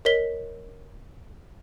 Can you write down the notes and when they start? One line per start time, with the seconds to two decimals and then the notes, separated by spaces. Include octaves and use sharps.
0.05 A#4 C#5 D#5 B6 G7